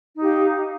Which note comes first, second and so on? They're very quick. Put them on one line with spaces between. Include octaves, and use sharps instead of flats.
D#4 G4 F5